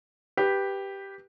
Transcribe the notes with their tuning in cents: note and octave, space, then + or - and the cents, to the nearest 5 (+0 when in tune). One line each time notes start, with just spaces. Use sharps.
G4 +0 B4 -5